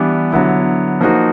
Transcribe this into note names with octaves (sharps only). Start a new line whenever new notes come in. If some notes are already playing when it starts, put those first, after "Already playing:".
Already playing: E3 G3 B3 D4
D3 F#3 B3 E4
F3 A#3 D#4 F#4